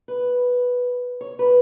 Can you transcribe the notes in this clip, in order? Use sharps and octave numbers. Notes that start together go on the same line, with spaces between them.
B4
C#5
B4